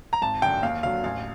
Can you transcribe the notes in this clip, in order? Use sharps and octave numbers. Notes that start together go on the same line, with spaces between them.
A#5
G#1 A5
F#2 D3 G5
D#2 F5
D3 F#3 F5
A1 F5